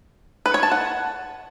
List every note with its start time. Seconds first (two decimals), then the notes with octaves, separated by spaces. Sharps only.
0.46 B4
0.54 C#5
0.63 A5
0.72 F#5